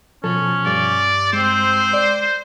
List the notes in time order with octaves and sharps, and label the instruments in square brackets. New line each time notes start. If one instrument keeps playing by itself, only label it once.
[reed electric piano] B2 F3 [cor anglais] C#4 [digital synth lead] A4
[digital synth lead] G2 [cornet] D5
[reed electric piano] G#3 [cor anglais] C4 [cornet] C5
[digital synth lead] D5